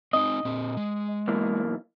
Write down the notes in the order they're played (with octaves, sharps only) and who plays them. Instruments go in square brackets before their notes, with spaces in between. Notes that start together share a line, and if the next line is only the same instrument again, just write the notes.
[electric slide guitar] C4 D#4 [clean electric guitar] D#5
[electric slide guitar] A#2 C4
G#3
[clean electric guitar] B1 E3 A#3